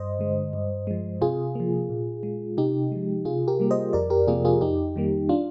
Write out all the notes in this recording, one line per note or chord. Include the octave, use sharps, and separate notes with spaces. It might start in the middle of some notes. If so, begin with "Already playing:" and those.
Already playing: G2 C5 D#5
D3 G#3
G2
F3 G#3
C3 F4 G#4
F3 A#3
A#2
G#3
C3 D#4 G4
F3 G#3
C3 F4 G#4
G4 A#4
G3 A#3
C5 D#5
F2 A#4 D5
G4 A#4
C3 F3 A#3 F4 G#4
F4 G#4
F2 D#4 G4
D#3 G3 A#3
D4 F4